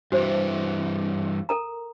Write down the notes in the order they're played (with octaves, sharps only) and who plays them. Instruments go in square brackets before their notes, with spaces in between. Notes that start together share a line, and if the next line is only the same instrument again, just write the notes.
[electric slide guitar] G2 E3 [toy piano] F#4 C5
[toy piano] A4 A#4 A#5